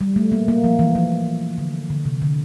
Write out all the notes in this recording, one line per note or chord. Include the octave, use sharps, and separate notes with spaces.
G3
A3
A#3
A#3
F3
E3
F3
D3
D3
C3
D3